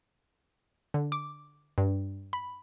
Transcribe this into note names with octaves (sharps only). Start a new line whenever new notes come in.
D3
D6
G2
B5